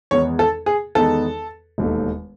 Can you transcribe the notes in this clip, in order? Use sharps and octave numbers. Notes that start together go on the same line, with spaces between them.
E2 D#3 G#3 B3 D#4 C#5
A4
G#4
E2 D#3 G#3 B3 D#4 A4
E1 D#2 D#3 A3